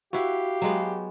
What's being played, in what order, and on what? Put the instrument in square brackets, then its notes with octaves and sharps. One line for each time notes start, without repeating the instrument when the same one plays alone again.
[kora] E4 B4 C#5 [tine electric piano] F#4 [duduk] G4 [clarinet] F5
[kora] F#3 G#3 B3